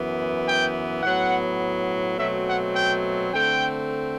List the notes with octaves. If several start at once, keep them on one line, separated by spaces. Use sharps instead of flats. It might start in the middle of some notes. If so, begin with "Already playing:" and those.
Already playing: F#2 E3 B3
G5
A2 F#3 B3 F#5
B2 F#3 A3 C4 E5
F#5
G5
D3 A3 C4 G5